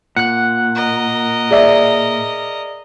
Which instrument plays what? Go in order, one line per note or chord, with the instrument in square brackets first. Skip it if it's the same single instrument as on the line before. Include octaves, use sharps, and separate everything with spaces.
[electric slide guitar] A#2 [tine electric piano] F#5 F#6
[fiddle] A#4 D#5
[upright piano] G#4 D5 E5